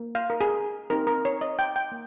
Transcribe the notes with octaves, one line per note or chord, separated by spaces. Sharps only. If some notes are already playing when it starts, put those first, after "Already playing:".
Already playing: A#3
F5
A#4
G#4
C4 D#4 G4 A#4
A#4
C#5
D#5
G5
G5
A#3